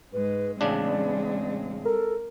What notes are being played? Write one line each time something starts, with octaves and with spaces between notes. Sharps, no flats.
G#2 G#3 B4
A1 C#3 G#3 C4 D4 D5
A4 A#4